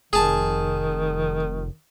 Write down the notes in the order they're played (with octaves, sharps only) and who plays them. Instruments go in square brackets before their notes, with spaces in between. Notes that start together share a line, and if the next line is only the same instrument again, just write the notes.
[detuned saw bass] F1 [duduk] D#3 [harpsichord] G#4 A5